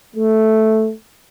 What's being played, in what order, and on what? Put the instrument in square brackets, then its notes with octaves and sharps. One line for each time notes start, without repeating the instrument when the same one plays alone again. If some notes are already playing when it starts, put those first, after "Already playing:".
[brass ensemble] A3